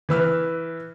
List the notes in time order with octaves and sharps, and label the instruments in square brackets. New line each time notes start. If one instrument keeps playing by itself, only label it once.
[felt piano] E3 B4 E6 F6